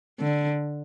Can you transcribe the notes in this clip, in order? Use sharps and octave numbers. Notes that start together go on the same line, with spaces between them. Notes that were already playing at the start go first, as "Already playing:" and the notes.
D3